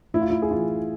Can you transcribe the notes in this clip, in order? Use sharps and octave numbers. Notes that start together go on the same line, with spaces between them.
A2 E4
F4
E4
G#4
E3 F4